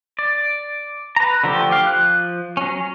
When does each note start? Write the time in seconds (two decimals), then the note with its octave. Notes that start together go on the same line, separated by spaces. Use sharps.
0.19 D5
1.16 B4 A#5
1.44 D3 F3 A3 G4
1.71 G4 F5
1.86 F3 F#6
2.57 F#3 C#4